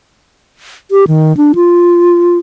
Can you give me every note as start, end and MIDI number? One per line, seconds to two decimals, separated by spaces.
0.91 1.05 67
1.08 1.36 51
1.37 1.52 62
1.55 2.38 65